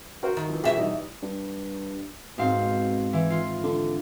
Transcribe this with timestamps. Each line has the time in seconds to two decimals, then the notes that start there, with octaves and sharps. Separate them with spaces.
0.23 F#4 A#4 C5
0.37 D#3
0.49 E3 F3
0.64 B2 F4 G4 G#4 E5
0.76 E3 G3 D#4
1.23 G2
2.38 G#2 B2 C4 F5
3.13 E3
3.30 F4
3.63 D3